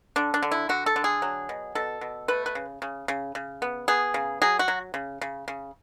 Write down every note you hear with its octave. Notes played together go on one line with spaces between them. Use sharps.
D3 D4
D4
D3
E4
D3 F#4
A4
D3
G#4
F#3
B2
B2 A4
B2
A3 B4
B4
C#3
C#3
C#3
C#3
B3
B3 G#4
C#3
F#3 G#4
F#4
F#3
C#3
C#3
C#3